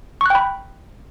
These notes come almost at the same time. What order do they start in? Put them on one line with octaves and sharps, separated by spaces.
C#6 F#6 G5 B5